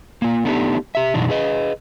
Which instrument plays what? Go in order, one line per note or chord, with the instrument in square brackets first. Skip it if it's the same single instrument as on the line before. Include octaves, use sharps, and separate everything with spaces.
[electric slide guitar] A#3 F4
A3 B3 D4 D#4 G4
G4 E5
F#2 B2 E3 D4 D#4
G#4 B4 D#5